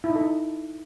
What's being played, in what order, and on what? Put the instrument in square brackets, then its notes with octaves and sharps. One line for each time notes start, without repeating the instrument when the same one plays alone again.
[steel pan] E4
D#4
A4
D#4